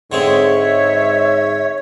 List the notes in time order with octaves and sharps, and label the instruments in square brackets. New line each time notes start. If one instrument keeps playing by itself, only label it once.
[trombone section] G#2 [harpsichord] D3 G#3 C4 [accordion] C#5 [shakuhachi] E5